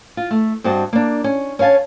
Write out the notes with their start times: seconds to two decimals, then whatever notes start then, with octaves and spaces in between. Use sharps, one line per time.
0.17 F4
0.31 A3
0.64 G2 C4 F#4 D#5 A5
0.93 A#3 D4
1.24 C#4
1.59 C#4 C#5 F5 G#5 A5